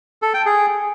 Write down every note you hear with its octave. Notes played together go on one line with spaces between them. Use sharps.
A4
G5
G#4